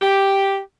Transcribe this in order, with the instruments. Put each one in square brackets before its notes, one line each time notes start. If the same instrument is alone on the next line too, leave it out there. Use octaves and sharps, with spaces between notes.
[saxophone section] G4